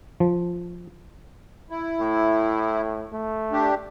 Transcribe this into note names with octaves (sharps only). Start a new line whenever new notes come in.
F3
E4
A2
A3
D4 G4